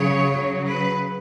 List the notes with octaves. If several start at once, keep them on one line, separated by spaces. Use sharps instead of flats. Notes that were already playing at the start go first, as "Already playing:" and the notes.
Already playing: C#3 F#3 C#5
C#3 F#3
B4